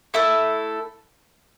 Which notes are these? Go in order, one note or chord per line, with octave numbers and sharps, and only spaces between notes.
A3 E4 A4